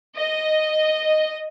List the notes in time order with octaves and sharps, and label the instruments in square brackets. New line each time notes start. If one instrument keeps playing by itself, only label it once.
[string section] D#5